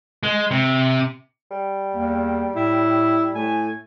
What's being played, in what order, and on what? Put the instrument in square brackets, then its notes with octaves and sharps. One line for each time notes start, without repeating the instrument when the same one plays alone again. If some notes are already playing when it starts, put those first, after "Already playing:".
[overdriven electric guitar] G#3
C3
[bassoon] G3
[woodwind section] E2 A#3
[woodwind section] A2 [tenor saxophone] E4
[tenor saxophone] A2 [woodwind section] A3 G#5